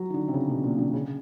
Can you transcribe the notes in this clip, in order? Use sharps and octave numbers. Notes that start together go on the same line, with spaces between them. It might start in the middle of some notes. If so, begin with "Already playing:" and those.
Already playing: F#3
D#3
D3
C3
C#3
B2
A#2
D3
C#3